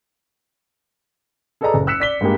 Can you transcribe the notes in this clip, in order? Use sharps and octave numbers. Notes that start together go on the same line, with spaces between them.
G#4 A4 B4 D5 D#5 A#5
F#1
E6 F#6 B6 C#7 E7
D5 B6 G7
G2 G#3 A#3 G4